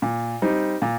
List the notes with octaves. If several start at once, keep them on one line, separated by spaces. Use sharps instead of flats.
A#2
G3 C4 D#4
A#2